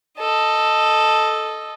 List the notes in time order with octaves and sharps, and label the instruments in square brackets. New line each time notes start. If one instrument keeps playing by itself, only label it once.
[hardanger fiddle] A4 D#5